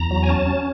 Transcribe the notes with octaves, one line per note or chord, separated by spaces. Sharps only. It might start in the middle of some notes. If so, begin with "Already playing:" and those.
Already playing: E2 A#5
F#3
G#5
C#4 A5
C#4